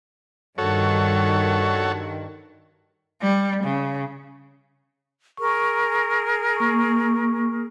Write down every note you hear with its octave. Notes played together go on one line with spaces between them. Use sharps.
G2 D#3 F#4 A4 C#5
G3
C#3
G#4 A#4 C#6
A#3 C#6